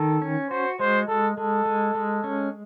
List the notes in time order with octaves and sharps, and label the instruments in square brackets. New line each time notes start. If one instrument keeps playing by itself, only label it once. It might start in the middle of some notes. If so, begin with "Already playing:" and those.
Already playing: [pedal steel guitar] D#3 [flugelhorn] A4
[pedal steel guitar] C#4
[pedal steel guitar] F#4 [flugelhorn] C5
[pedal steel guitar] G#3 [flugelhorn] C5
[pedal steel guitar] G#3 [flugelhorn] A4
[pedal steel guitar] G#3 [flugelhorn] A4
[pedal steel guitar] G#3
G#3
C#4